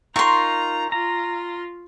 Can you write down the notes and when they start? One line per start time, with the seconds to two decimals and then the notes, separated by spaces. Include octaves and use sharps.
0.16 D#4 F4 A#4 A#5 C6 C#6
0.92 F4 A#5